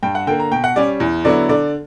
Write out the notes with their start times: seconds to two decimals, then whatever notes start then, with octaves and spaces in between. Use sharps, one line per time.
0.03 G2 G5
0.15 F#5
0.27 D3 A#3 G5
0.40 A#5
0.51 B2 G5
0.64 F#5
0.76 G3 C#4 D5
1.00 E2
1.25 D3 F#3 B3 E4 D5
1.49 D3 D5